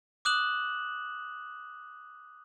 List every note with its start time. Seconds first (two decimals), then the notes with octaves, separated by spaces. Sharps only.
0.25 D6 D#6 F#6 E7 F#7